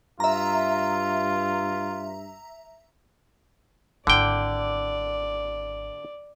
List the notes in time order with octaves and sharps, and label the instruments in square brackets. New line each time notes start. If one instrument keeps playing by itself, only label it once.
[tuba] G2 [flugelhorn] F4 [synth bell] E5 A#5
[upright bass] G#1 E4 [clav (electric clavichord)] D3 G5 [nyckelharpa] D5